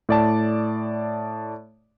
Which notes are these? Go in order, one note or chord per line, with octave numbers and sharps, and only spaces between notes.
A2 D5 A5